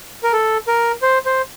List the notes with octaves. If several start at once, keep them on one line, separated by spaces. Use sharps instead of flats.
A#4
A4
A#4
C5
C5